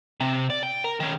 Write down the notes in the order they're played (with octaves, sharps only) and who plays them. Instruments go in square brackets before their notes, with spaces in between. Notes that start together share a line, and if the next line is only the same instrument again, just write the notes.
[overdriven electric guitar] C3
D5
G5
A#4
D#3 C#4